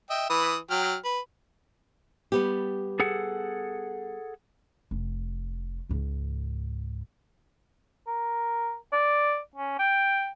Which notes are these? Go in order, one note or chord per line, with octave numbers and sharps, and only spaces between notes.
D#5 E5 G5
E3 B4 D#6
F#3 G5 F6
B4
G3 B3 G4
G#4 A4 F#5
F1
C#2 G#2
A#4
D5
C#4
G5